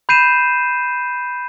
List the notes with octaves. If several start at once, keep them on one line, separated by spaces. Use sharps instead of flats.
B5 G6 C7 D#7 E7